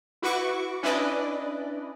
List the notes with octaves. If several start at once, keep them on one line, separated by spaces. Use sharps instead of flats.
E4 F#4 B4 C#6 D6
C#4 D4 E4 B4 D5 D#5